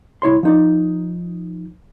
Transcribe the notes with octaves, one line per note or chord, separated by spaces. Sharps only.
C2 E4 C#5 C6
F3 D#4 D5